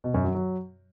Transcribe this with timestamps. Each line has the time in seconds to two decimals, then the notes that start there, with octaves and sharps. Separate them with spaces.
0.04 B2
0.14 F#2
0.24 F#3
0.35 F#3